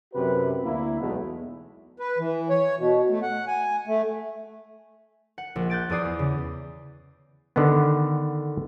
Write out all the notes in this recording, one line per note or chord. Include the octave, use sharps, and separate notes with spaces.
F#2 C3 F#4 B4
D2 A#3 E4
B1 E2 B2 G#3 A3 B3
B4
E3
C#5
B2
A3
F#5
G#5
A3
F#5
A#1
F#6 G6 A6 D7
E2 G#4 D5 D#6 C7
B3
C#3
D3 D#3 B3